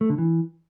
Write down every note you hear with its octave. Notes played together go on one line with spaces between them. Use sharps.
A3
D3
E3